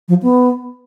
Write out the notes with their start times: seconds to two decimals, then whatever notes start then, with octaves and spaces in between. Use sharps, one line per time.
0.09 F3
0.23 B3